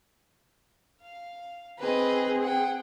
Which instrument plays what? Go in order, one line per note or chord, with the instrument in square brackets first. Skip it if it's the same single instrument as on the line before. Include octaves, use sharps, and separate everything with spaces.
[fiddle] F5
[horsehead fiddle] C4 G#4 [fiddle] B4 D#5
[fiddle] F#5 G5